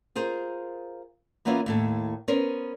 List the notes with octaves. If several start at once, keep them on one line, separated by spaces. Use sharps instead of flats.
F4 G#4 A#4 C5
E3 A#3 B3 C#4 E4 F4
D#2 A2 A4
B3 C#4 A#4 C5